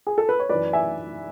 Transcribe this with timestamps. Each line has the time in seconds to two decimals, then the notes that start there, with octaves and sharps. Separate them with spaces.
0.07 G#4
0.18 A4
0.29 B4
0.39 C#5
0.49 F#2 E3 B4 D5
0.73 E5 G#5